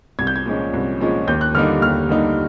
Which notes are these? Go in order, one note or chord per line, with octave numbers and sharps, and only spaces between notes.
C2 G#6
G6
G#6
A#2 F3 G#3 C#4
C2
A#2 F3 G#3 C#4
D#2 G6
F#6
D3 G3 A#3 D#4 F6
D#2 F6
D3 G3 A#3 D#4